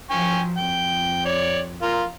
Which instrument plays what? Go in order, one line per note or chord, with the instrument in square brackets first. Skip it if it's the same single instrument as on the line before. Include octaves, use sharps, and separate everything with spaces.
[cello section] F3 F#3 [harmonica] G5 G#5 C#6
[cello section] F2 [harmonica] G5
[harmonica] C#5 D5
F4 A#4